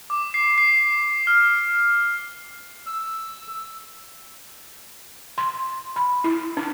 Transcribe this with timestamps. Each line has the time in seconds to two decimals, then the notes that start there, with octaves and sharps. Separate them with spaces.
0.10 D6
0.34 C7
0.58 C7
1.27 F6
2.86 E6
5.38 C6
5.96 B5
6.24 E4
6.57 D4